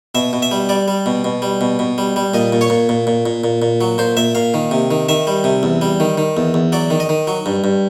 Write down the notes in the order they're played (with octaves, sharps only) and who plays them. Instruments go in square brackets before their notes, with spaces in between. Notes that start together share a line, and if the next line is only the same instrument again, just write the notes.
[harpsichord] B2 E5
B2
E5
G3
G3 D5
G3
B2
B2
G3
B2
B2
G3
G3
A#2 D#5
A#2
C#5
A#2
A#2
A#2
A#2
A#2
A#2
F#3
A#2 C5
A#2 E5
A#2 F5
D#3
C3
D#3
D#3 E5
G3
C3
E2
G3
D#3
D#3
E2
E2
F#3 D5
D#3
D#5
D#3
F#3
G2
G2